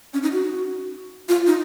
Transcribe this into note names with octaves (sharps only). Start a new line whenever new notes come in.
C#4
D#4
F#4
F4
D#4